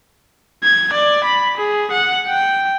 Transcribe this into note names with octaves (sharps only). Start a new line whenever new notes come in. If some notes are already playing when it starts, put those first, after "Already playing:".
G#6
D5
B5
G#4
F#5
G5